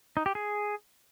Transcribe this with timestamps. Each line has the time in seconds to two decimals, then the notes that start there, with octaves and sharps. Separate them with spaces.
0.17 D#4
0.26 G4
0.35 G#4